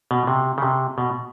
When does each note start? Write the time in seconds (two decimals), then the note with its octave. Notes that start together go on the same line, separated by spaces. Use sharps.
0.11 B2
0.27 C3
0.58 C#3
0.62 C3
0.98 B2